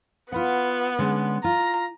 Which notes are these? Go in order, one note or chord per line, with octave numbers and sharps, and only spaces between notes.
B3 F4 B4 F#5
D3 G#3 C#4
F4 A#5